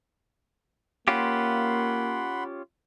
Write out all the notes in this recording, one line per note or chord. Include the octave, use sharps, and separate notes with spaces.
A#3 C#4 F4 G4 F#5 B5 C6